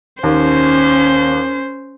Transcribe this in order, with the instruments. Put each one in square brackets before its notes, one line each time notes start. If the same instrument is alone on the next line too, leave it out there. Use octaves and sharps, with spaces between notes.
[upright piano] D#2 [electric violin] C#4 C5